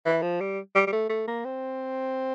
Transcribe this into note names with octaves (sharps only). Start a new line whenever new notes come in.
E3
F3
G3
G3
G3
A3
A3
A#3
C4